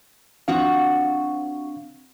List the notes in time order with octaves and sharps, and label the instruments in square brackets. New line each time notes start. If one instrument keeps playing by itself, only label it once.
[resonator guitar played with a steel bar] F3 F#4 F#5 [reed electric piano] C4 D4 F5